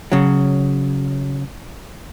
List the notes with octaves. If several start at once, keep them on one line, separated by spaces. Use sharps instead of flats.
C#3 F#3